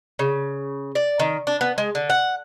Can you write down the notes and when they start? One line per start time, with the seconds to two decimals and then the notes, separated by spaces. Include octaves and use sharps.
0.19 C#3
0.95 D5
1.20 D#3
1.47 D4
1.61 B3
1.78 G#3
1.95 D3
2.10 F#5